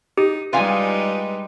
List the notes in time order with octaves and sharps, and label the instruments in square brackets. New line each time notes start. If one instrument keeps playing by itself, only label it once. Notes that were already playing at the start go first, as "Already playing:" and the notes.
[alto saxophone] D#4 [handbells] G4
[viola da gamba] G3 G#3 D#4 [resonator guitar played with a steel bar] F4 F5 G#5 [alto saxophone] B4